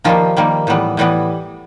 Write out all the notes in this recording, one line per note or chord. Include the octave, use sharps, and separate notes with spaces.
D#3 F3 G3 A#3 F4
D#3 G3 A#3
A2 E3 G3 B3
A2 E3 G3 B3